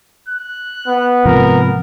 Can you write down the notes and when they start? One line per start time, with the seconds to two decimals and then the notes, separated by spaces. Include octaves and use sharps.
0.29 F#6
0.88 B3
1.25 G#2 C3 F3 A#4